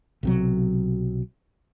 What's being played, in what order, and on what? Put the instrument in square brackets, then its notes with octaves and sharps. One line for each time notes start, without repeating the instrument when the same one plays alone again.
[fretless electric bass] B1 C3 F#3